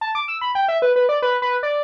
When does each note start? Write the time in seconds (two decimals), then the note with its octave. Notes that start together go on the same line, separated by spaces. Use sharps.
0.01 A5
0.15 D6
0.28 E6
0.41 B5
0.55 G5
0.68 E5
0.82 B4
0.96 B4
1.09 D5
1.22 B4
1.42 B4
1.63 D5